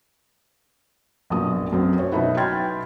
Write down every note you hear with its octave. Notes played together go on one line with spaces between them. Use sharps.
A#1 F#2 B2 D#6
F#2 F#3 C4
C#5
B2 F#3 B3 D#4 E4 F#4
G5 B5 C6 F6 G#6 A6